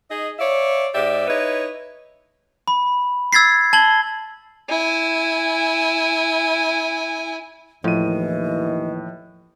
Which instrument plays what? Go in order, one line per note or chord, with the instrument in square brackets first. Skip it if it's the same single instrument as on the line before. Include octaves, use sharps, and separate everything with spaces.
[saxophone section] D#4 G#4 D#5
C#5 D5 E5 F5
G#2 G4 D5 E5
D#4 E4 B4 C#5
[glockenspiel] B5
E6 G#6 A6 B6 C7
A5 G#6 F#7 G7
[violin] E4 G#5
[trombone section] D#2 E3 [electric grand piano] A2 D#7 [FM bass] F3 [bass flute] D#5